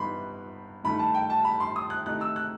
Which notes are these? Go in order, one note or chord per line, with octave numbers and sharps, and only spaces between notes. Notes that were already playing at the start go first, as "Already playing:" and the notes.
Already playing: G2 E3 B3 D#4 B5 C6
G2 D#3 A3 B5
A5
G5
A5
B5
C6
D#6
F#6
C3 D#3 A3 D#4 F#6
E6
F#6